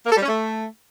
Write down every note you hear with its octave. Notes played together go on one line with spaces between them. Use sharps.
A#3
A4
G3
C#4
A3